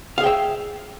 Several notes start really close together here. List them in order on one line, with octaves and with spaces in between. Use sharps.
F5 G#4 G5 E5